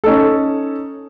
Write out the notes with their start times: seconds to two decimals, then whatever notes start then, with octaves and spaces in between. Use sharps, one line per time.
0.04 C#4 D#4 A4